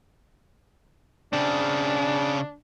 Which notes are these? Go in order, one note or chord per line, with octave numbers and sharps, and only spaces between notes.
C#3 C4 D4